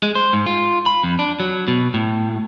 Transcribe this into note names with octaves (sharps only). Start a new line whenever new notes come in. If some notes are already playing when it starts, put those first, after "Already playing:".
G#3
C5
G#2
F4
B5
F2
D4
F#3
B2
A2